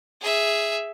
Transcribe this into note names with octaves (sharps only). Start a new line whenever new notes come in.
G#4 E5